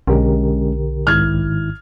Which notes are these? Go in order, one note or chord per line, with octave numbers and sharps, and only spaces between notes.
B1 D3 G#3 C#4 G4 A#4
G#1 G#2 D#3 E4 F6 G#6